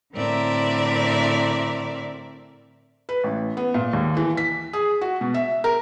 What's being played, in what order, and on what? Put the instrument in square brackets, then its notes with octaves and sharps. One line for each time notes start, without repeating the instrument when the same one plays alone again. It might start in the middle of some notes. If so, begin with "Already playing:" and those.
[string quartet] A2 D3 C4 A#4 D5 E5
[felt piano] B4
A1
B3
A#2
D#2
E3
B6
G#4
F#4
B2
E5
A#4